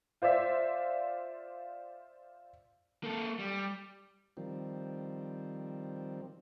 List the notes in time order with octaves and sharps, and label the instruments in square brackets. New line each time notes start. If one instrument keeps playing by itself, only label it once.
[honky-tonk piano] F4 C5 D5 E5
[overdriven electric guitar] A#3 A4
G3
[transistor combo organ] D#3 F3 G3 C4